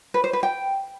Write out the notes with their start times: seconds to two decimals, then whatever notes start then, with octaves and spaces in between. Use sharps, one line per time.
0.14 B4
0.24 C5
0.33 B4
0.43 G5